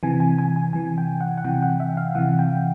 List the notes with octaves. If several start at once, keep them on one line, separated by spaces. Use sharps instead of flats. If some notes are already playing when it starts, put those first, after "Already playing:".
C3 E3 G#5
G#5
G#5
G#5
C3 E3 G#5
G5
F#5
F#5
C3 E3 G5
F#5
E5
F5
C3 E3 F#5
G5